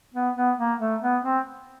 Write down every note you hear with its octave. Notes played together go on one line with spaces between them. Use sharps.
B3
B3
A#3
A3
B3
C4